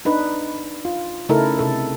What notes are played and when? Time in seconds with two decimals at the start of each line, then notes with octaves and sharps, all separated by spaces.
0.05 D4 D#4 B4
0.85 F4
1.29 C#3 A3 D#4 E4 A4 A#4
1.59 C3 A4